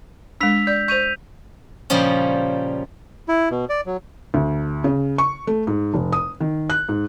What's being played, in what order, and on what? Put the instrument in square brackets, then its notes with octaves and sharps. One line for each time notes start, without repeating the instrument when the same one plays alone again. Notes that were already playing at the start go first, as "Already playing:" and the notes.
[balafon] G#3 D4 [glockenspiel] E6 B6 F7
[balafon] D5 [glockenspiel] G6
[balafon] C5 C#6 [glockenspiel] G6 D#7 F7
[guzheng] A#2 C#3 F3 G3 C#4
[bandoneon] E4
B2
D5
F#3
[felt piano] D2
C#3
C#6
A3
G#2
F1
D#6
D#3
F#6
G#2